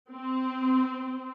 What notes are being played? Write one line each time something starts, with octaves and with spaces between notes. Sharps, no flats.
C4